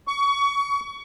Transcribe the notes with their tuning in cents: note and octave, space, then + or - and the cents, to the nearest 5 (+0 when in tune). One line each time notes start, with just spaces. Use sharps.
C#6 +25